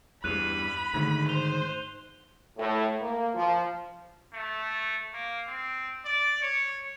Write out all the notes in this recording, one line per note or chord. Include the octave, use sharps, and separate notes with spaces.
E2 G2 B5 F#6 D#7 F7
G#2 D3 D#3 A3
C5 F7 G7
A2
A#3
F3
A3
A#3
C4
D5
C#5